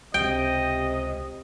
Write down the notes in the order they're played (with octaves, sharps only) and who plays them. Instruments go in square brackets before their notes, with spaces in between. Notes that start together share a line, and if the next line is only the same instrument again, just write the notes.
[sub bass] C#2 [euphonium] C3 [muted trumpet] D#5 [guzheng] G5